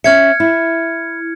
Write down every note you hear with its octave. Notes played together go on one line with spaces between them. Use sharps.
C#4 E5 F6 G#6 C#7
E4